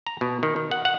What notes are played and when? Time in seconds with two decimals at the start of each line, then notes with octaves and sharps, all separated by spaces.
0.07 A#5
0.21 B2
0.43 D#3
0.56 D#3
0.71 F#5
0.85 F#5